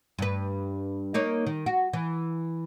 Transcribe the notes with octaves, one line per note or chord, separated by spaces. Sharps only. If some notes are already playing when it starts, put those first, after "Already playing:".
G2 B4
A#3 D#4 C#5
D#3
F#4
E3